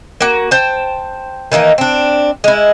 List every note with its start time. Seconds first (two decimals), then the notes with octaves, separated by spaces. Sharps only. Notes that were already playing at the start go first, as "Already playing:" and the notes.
0.21 A#3 F#4
0.51 C5 G5 A5
1.52 D#3 E3 A#3 D#4
1.78 C4 D4
2.44 G#3 E4